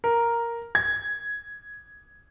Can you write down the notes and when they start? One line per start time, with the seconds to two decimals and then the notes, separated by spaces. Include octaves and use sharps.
0.04 A#4
0.75 G#6